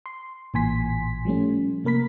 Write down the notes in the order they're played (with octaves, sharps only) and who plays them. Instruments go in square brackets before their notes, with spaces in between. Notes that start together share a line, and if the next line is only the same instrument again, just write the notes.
[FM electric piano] C6
A1 A#2 E3 G#5 C6 B6
F3 G3 A3 C#4
C3 A#3 A#4 B5 B6